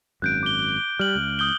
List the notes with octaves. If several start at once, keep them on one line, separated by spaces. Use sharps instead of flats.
G#1 F#2 F#6 G6 D7
D6 G7
G3 F6 F#7
C#2
D#6 G6 G7